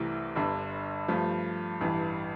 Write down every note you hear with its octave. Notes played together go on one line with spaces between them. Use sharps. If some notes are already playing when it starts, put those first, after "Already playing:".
Already playing: C2 C3 E3 A3 E4
G1 G2 D3
G2 F3 A3
A1 G2 E3